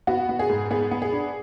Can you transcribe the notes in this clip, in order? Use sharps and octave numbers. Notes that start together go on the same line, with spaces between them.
B3 F#4
B3
G#4
G#2
B3 G#4
B3
G#4
D4